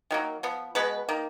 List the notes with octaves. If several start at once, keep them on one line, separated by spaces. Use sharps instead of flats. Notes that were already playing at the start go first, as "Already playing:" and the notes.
D#3 F#3 A#3
F3 B3
B2 G#3 B3 B4
D#3 A#3